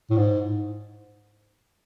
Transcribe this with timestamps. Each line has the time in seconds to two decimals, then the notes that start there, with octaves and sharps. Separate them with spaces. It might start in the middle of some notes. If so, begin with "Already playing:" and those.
0.11 A2
0.17 G#2